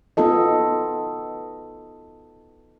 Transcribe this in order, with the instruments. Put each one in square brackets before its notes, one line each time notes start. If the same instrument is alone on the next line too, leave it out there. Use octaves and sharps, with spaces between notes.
[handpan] B3 D#4 F4 A4 D#5